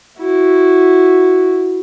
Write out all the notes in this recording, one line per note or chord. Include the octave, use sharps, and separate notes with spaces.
E4 F#4